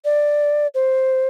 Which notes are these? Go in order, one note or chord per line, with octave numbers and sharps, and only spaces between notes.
D5
C5